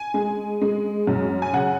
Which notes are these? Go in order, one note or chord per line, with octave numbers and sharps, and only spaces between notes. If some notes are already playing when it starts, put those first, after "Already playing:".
Already playing: G#5
G#3
G#3
F#2
G#5
C#3 F#5